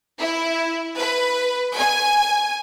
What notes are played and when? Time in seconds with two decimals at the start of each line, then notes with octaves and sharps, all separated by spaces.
0.19 E4
0.97 B4
1.77 G#5